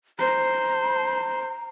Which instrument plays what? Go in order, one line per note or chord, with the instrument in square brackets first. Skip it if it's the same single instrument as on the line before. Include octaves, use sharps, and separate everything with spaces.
[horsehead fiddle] C5 [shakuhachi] A#5